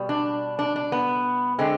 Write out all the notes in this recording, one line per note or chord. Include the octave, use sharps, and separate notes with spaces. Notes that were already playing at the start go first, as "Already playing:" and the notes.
Already playing: B2 G3
D4
D4
D4
B3
D3 G#3 C4